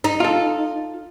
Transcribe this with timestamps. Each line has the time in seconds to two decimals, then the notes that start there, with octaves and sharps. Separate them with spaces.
0.04 D#4
0.20 F4 A4